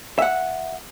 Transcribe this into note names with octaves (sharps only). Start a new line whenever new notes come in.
E5 F#5